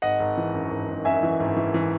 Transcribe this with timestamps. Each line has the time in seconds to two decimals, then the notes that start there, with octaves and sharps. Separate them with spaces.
0.02 G#1 D#5 F#5
0.20 G#1
0.37 E3
0.54 F#2
0.71 G#1
0.88 G#1
1.05 F#2 E5 G#5
1.23 E3
1.40 G#1
1.57 E3
1.74 E3